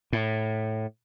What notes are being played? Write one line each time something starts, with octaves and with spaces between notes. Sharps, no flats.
A2